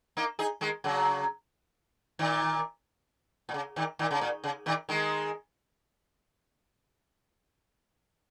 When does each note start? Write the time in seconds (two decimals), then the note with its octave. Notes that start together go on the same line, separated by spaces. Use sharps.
0.17 A#3 D#4
0.39 D#4 G#4
0.61 D#3 G#3
0.84 C#3 F#3
2.19 A#2 D#3
3.49 A#2
3.54 C#3
3.76 A#2 D#3
3.99 A#2 D#3
4.11 C#3
4.21 A#2
4.44 C#3
4.66 A#2 D#3
4.89 D#3 G#3